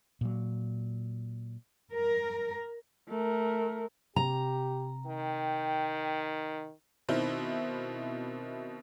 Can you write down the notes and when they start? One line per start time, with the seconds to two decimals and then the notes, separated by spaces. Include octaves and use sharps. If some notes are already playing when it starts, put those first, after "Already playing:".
0.21 A#2 F#3
1.93 A#4
3.09 A3 A#4
4.16 C3 G4 A#5
5.06 D#3 G5
7.09 B2 D#3 C4 E4